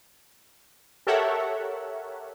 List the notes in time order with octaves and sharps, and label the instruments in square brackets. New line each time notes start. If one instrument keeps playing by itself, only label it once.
[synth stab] G4 A4 A#4 C#5 E5 F#5